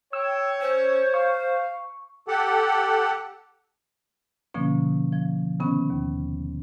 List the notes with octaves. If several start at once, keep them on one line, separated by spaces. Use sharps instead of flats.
C#5 G5 E6
C#4 C5
F5 C#6
G4 A4 F#5
B2 D3 F3 A#3 C#4
F3
C3 D#3 B3 C#4
D#2